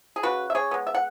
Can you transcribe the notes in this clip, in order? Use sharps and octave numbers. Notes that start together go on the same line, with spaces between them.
G#4
C#3 F#4 B4
E5
G#4 C#5
G#3 B3
E5
F#5